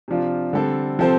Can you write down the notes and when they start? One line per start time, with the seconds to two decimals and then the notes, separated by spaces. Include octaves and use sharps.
0.08 C3 F3 D4 F4
0.53 D3 G3 C4 A4
0.99 C3 F3 C4 A4 C5